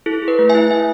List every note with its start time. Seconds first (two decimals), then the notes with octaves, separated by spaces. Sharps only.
0.06 E4 A4
0.22 G#4
0.28 B4
0.39 A3
0.49 E5 G#5
0.55 E4
0.71 A3 E5 G#5